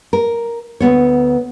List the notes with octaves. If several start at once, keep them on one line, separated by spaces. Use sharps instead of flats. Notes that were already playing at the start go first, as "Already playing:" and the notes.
A#4
D2 C3 B3 C#5